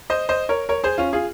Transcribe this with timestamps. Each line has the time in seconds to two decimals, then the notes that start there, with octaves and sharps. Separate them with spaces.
0.10 C5 D#5
0.29 C5 D#5
0.49 A#4 C#5
0.69 A#4 C#5
0.84 G#4 C5
0.98 C#4 F4
1.13 F4 G#4